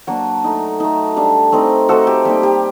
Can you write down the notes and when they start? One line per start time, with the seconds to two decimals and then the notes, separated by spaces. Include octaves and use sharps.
0.07 F#3 A#3 D4 F#4
0.44 A3 D#4
0.80 A3 D#4
1.16 G3 D4
1.52 A3 C4 D#4
1.89 A3 C4 D#4 F#4 A4
2.07 G4
2.25 G3 A#3 D#4 G4
2.43 G4